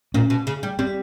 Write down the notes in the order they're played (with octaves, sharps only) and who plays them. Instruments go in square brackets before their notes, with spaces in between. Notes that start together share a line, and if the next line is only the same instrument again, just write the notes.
[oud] A#2 [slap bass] C#4
[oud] B2
C#3
G3
[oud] G3 [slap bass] C4